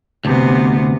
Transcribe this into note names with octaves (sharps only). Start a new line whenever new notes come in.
D2 C3 B3